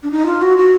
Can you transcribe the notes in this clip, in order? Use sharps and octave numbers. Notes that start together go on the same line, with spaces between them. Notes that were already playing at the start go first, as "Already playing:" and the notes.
D4
D#4
F4
F#4
F#4